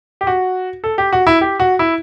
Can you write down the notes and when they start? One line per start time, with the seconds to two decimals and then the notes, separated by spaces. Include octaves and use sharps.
0.21 G4
0.27 F#4
0.84 A4
0.98 G4
1.13 F#4
1.27 E4
1.41 G4
1.60 F#4
1.79 E4